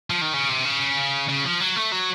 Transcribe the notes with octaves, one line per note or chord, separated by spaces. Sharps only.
F3
D#3
C#3
C3
C#3
C#3
F3
F#3
A3
F#3